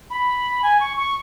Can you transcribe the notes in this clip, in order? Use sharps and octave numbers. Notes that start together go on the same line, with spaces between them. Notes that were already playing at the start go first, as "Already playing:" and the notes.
B5
G#5
C#6
C#6